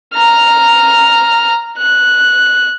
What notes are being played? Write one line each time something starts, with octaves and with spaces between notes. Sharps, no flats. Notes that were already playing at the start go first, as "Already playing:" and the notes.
A#5 F6
F#6